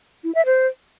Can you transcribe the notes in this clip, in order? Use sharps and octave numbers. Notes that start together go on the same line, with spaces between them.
E4
E5
C5